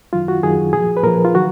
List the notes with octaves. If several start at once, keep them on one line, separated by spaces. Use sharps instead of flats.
F#2 D#3 F#3 F4
F#4
F#2 D#3 F#3 G#4
A#2 F3 G#4
B4
A#2 F3 A#4
F4
D#3 F#3 F#4